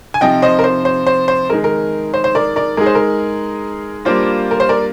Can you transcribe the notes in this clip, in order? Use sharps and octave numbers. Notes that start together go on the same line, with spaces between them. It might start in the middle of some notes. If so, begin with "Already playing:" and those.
G#5
C3 F3 C4 D#4 D#5 G5
C5 D#5
A#4
C5
C5
C5
C5
D#3 G#3 D#4 G#4 A#4
A#4
C5
C5
A#4 D5
A#4 D5
G#3 D#4 G#4 A#4
C5
A#4
G3 A#3 D4 F4 C5
A#4
C5
A#4 D5